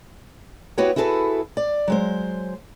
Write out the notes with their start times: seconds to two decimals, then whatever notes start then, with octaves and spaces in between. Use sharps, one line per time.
0.78 B3 E4 F#4 G4 B4 C#5
0.96 E4 F#4 G#4 A4 B4
1.57 D5
1.88 F#3 G#3 C5